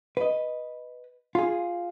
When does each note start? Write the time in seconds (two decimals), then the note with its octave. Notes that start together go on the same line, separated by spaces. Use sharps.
0.17 B4 D#5
1.35 F4 G#4